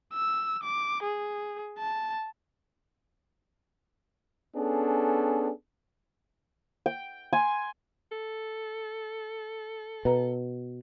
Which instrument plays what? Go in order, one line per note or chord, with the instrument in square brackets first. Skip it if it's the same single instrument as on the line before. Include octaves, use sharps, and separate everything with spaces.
[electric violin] E6
D6
G#4
A5
[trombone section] B3 C#4 D4 G#4 A4
[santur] G5
G#5 C6
[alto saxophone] A4
[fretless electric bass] B2 [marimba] B4 A#5